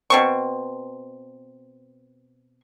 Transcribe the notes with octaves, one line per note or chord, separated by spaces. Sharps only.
B2 C4 C#6